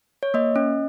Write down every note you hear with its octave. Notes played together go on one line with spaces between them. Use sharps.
C#5
A#3 D#5
C#4